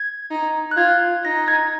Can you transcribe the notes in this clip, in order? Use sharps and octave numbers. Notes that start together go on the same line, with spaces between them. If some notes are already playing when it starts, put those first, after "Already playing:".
Already playing: G#6
D#4
F#6
F4 G#6
D#4 A#6
G#6